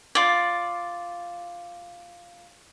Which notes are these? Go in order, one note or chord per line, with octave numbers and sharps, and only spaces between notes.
F4 D5